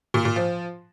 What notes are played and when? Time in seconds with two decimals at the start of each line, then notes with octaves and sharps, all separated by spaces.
0.14 A#2
0.25 A#2
0.36 F3